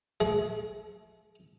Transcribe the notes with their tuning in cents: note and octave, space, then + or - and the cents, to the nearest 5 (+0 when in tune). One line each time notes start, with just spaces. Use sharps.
A3 -45 G#4 +0